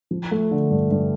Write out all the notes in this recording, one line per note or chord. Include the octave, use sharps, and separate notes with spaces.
F3
A3
D3
G2
G2